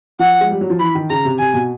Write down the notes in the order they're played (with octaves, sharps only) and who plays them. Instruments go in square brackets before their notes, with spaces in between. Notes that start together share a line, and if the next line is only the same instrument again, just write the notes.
[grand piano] F3 [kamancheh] F#5
[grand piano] G#3
G3
F#3
F3
[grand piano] E3 [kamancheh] B5
[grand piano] D#3
[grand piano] C#3 [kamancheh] A#5
[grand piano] C3
[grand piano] C3 [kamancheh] G#5
[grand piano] B2